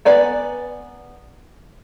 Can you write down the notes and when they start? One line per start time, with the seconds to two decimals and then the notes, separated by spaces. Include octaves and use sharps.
0.05 B3 B4 D5 G#5 A#5